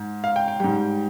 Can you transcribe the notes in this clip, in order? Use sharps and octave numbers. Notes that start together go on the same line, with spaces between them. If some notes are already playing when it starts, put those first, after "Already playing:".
Already playing: G#2
F5
G5
G5
G#2 G3 G5